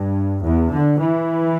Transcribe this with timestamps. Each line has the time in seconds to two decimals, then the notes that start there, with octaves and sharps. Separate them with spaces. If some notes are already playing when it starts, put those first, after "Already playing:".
Already playing: G2
0.42 E2
0.69 D3
0.98 E3